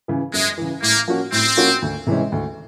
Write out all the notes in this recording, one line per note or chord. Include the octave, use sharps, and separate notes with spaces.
C#3 E3
F#2 G#3
C#3 E3
A2 A#3
F3 A#3 C#4 F#4
A2 C4
F3 A#3 C#4 F#4
D2
C3 E3 G#3 C#4
D2